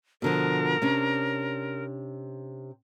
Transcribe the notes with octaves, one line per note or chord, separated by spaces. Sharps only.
B2 D3 F3 A#4
C3 C#4 D4